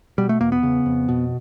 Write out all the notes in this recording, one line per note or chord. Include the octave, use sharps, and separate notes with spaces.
B2 G3
A3
E2 A#3
B3
C#3
F2
B2